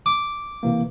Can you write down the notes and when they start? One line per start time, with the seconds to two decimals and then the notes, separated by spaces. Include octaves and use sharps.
0.06 D6
0.63 C3 E3 A#3